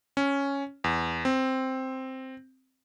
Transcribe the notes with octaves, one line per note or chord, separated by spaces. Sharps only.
C#4
E2
C4